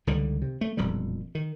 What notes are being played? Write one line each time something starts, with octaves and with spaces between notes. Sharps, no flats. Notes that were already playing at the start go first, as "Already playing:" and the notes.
C#2 D3 D#3 G3
C3
A3
E1 F2 A#2 G3
D#3